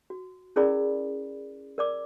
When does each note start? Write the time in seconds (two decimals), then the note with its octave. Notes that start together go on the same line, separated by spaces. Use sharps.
0.10 F#4
0.56 C#4 E4 G#4 A#4 D5 B5
1.78 A#4 D5 D6